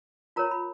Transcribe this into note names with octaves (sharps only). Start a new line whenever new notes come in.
F4 A#4 C#5 A#5
B5